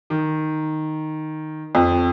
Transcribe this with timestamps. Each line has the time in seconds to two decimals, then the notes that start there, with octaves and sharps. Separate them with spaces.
0.10 D#3
1.75 F2